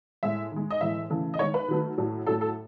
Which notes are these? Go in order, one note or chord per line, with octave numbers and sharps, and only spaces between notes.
A2 G#3 E5
D#3 G#3
D#5
A2 E3 G#3 E5
C#3 E3 A3
D#5
D#3 G#3 C#5
B4
D#3 F#3 A3
A2 F#3 A3
A2 F#3 A3 A4
A4